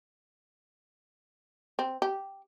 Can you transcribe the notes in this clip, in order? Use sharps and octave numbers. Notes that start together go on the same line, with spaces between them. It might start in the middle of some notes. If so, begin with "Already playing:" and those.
C4
G4